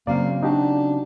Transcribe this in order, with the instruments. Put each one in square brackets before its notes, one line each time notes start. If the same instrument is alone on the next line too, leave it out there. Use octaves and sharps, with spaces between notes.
[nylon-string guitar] C#3 F#3 C4 [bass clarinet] A#3 [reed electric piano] D5 F5
[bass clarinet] D4 [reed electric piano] D#4 F#4 G4